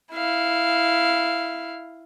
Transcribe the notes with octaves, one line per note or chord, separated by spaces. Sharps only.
E4 F5